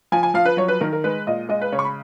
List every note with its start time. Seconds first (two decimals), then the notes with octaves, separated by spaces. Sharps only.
0.12 F3 G#5
0.23 G#5
0.34 F3 F5
0.45 B4
0.57 F#3 C#5
0.68 B4
0.81 D#3 A#4
0.93 A#4
1.04 G#3 B4
1.27 A#2 D#5
1.49 G#3 D#5
1.61 B4
1.72 C#3 C#5
1.79 C#6
1.84 B5